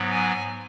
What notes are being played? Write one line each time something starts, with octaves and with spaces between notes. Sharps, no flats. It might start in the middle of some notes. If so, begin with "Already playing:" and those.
Already playing: G#2 F#3 B3
G#5